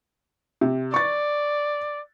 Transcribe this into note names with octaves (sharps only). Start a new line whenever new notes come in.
C3
D5 C#6 A6